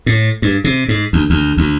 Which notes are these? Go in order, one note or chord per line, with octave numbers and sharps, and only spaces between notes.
A2
G2
C3
G#2
D2
D2
D2